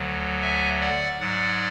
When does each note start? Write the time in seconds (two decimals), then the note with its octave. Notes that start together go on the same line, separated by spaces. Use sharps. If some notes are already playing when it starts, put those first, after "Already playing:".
Already playing: D2 D3 F#3
0.42 E5 G#5
0.81 D5 F#5
1.20 G#2 F#3 D5 F#5